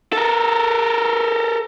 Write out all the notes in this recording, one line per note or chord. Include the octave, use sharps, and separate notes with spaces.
A4 A#4